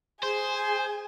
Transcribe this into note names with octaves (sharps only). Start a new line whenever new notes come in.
G#4 C5 G#5